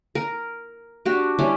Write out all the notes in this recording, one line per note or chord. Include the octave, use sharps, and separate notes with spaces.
A#4
D4 F#4 G4
G3 C#4 E4